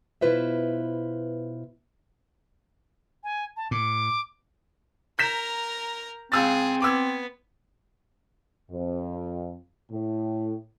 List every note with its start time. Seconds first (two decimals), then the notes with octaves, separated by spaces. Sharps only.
0.21 B2 E4 F4 B4 C5 E5
3.24 G#5
3.57 A5
3.71 A2 D6
5.19 A#4 A#5 G6 B6 E7
6.32 C#2 C4 G#4 E6 A6
6.82 B3 D6 E6 G#6
8.70 F2
9.90 A2